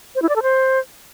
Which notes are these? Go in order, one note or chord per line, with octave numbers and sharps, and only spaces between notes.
C5
E4
D5
A4
C5